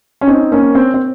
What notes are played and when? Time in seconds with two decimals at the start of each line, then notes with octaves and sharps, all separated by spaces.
0.21 C#4
0.27 C4 D#4
0.52 A#3 C#4
0.75 C4
0.94 C4